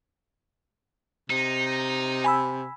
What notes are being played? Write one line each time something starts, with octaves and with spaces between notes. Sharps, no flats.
C3 D#4
G#5 B5 E6